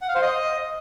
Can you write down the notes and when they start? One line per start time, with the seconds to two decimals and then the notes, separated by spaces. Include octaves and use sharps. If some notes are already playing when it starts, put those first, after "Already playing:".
0.02 F#5
0.08 F5
0.15 C5
0.22 D#5